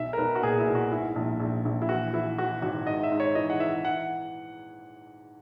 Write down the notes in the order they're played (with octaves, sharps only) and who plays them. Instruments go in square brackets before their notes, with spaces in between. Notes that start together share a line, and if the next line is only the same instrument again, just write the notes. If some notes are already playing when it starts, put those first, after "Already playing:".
Already playing: [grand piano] B1 E5
A#4
B1 B4
F#4
A#2 G#4
E4
B1
F#4
G#2 E4
A#1
A#1
A#1
E4
E3 F#4
E3 E4
E3 F#4
G#1 F#4
G#2 D#5
E5
G#2
C#5
E3 D#5
F#5
E3 E5
E3 F#5